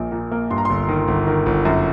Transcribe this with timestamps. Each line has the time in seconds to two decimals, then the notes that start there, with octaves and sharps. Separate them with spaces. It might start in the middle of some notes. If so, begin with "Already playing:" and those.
Already playing: A#1 A#2 A#3
0.12 A#2
0.32 A#3
0.50 G2 C6
0.58 A#5
0.65 G1 C6
0.88 D#3
1.08 G1
1.27 D#3
1.46 G1
1.65 F#2